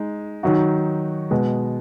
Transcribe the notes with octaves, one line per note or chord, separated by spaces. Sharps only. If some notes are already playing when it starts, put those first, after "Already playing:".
Already playing: G#3 D#4
D#3 F#3 D#4 F#4
B2 G#3 B3